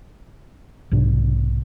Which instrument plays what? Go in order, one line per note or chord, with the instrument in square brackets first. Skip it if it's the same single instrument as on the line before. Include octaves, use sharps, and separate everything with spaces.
[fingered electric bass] B1 G#2 C3 D4